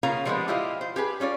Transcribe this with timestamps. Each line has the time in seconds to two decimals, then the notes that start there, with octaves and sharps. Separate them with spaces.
0.03 C#3 A#3 B3 F4 F5 A#5
0.25 F3 G3 G#3 A#3 B3 C5
0.48 E4 F4 G4 C5 D#5 F5
0.81 C5
0.96 G4 G#4 B4
1.20 G3 C#4 F4 D5